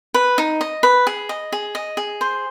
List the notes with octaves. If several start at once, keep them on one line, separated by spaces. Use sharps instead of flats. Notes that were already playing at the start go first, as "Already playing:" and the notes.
B4
D#4
D#5
B4
G#4
D#5
G#4
D#5
G#4
C5